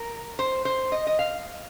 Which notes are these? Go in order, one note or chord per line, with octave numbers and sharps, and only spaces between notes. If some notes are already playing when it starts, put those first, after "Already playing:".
Already playing: A#4
C5
C5
D#5
D#5
F5